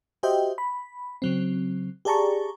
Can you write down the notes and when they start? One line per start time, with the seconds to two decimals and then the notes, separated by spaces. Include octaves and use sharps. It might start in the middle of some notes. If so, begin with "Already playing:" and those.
0.23 F#4 G4 C5 D#5 E5 G5
0.58 B5
1.22 C#3 F#3 C4
2.05 G4 G#4 D5 A5 A#5 C#6